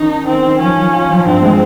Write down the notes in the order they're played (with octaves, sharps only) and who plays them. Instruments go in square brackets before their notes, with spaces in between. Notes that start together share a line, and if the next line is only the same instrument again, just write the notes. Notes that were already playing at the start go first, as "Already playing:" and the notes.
Already playing: [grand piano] D#3 C#4 [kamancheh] D#4
[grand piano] C#4
[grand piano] D#3 [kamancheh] C4
[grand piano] D#3
[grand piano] F3 [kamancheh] C#4
[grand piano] F3
F4
F3
[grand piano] G2 [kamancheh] C4
[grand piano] G#3